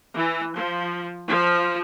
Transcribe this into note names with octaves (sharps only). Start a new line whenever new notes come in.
E3
F3
F3